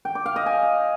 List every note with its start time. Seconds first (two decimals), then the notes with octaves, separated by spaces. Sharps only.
0.05 G5
0.15 D6
0.26 F5
0.36 D#5
0.46 G#5